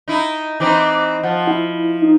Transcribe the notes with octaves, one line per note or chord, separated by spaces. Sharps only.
D#4 E4
E3 C4 D#4 D6
F3 F#5
E4
D#4